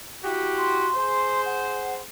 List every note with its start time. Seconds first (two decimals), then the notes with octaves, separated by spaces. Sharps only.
0.24 E4 F#4 G4
0.58 C6
0.95 G#4 C5
1.46 F#5